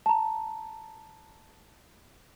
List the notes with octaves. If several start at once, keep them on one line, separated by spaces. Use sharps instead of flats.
A5 A#5